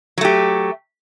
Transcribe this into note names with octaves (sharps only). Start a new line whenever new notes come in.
F#3 A3 G4